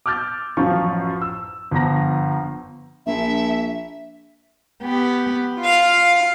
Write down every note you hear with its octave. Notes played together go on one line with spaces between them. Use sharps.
D6 E6 F6 G6 A6
A1 F#2 F3 F4 C#6
E6
G1 F3 A#5 A#6
A#1 E5
B3 G4
F4 F5